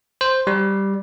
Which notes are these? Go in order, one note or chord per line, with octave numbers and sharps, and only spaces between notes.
C5
G3